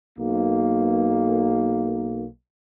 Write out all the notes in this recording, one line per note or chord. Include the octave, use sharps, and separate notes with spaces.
B1 A#3